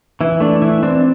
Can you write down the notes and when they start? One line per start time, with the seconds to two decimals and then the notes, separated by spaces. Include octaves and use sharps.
0.21 E3 E4
0.40 A3 D4
0.62 E3 E4
0.83 C4 D4